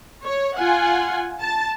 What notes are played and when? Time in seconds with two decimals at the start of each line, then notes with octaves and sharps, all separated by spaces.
0.24 C#5
0.57 F4 F#5 G#5
1.40 A5